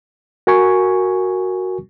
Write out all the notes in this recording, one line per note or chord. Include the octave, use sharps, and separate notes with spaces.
F#4 A#4 G#5 C#6